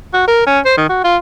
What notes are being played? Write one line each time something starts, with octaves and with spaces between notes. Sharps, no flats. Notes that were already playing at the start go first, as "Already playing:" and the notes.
F#4
A#4
C#4
C5
D#3
F#4
F4